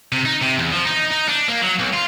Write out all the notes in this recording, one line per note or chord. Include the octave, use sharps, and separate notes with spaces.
C3
D#4
C3
E2
F3
D#4
D#4
D4
A#3
F#3
B1
F4